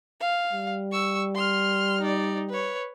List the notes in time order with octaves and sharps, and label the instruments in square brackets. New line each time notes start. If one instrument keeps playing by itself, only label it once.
[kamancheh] F5
[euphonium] G3
[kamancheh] C#6 E6
C6 F6
D#4 D5
B4 C#5